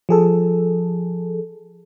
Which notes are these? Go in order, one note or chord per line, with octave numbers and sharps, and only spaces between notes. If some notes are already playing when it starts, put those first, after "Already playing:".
F3 G#4 A4